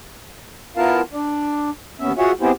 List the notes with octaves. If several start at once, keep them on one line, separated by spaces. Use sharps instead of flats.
B3 E4 F4 A#4 F5 A5
D4 D5
D#2 B3 C#4 E5
F4 F#4 G#4 C#5 E5 F#5
B3 C4 E4 G4 G#4 C5